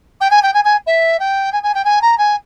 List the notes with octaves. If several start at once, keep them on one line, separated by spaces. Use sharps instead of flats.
G5
G#5
G5
G#5
G#5
E5
G5
G#5
G#5
G5
G#5
A#5
G#5